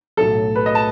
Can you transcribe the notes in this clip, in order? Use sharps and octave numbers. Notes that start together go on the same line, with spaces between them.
B1 A2 F#3 A3 A4
B4
D#5
A5